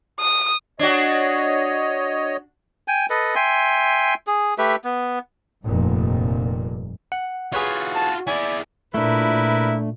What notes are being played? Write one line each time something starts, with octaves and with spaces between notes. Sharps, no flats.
D#6
D4 F#4 C#5 D#5
G5 G#5
A4 B4 D#5
E5 G5 G#5 C6
G#4
A3 G4 B4 E5
B3
F1 G2 A#2
F#5
F4 F#4 G#4 B4 C#5
A5
E4 G#4 D5 G#5
A#2 A3 D4 E4 A#4 B4